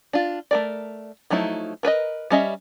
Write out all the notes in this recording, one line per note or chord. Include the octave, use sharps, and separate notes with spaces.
D4 F4
A3 A#4 D5
F3 F#3 A3 D#4 E4
A#4 B4 D5 D#5
G3 C#4 D#5 E5